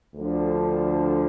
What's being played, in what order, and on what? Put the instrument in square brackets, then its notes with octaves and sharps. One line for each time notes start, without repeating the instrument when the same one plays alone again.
[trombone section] D2 D3 F3